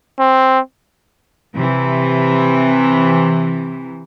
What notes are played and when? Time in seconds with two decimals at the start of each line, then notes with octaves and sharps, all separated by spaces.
0.20 C4
1.54 C3 E3